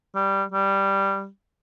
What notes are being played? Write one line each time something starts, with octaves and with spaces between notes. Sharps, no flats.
G3
G3